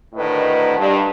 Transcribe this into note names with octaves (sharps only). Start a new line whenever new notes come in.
D2 A2 D#3 B4 D#5
G2